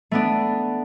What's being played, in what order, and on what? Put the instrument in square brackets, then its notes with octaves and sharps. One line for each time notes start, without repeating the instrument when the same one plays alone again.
[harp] A3 B3 D4